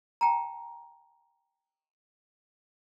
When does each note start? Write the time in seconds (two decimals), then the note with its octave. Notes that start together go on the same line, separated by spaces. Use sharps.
0.21 G5 A5 A#5